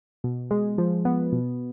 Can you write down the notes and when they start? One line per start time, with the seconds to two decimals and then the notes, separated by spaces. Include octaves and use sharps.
0.24 B2
0.51 G#3
0.78 F3
1.05 B3
1.32 B2